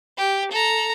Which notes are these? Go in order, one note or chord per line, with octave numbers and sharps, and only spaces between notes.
G4
A4 A#5